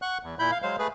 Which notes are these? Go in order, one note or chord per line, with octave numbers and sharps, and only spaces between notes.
F#5 C#6 F#6
E2
A#2 E4 B5 G6
F5
F#3 G#3 C5 F5
A3 G#4 B4